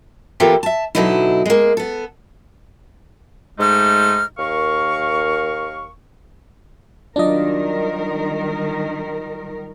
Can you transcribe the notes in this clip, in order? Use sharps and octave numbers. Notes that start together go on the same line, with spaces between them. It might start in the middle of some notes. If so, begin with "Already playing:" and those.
E3 A#3 B3 F4 G4 A4
E5 A5
B2 D3 F3 F#3 D#4 E4
G#3 A#3
B3 A4
G#2 G#3 A3 D#4 F6
D#2 A#4 F5 C#6
D#3 F#3 G3 D4 F4 A#4 D5 D#5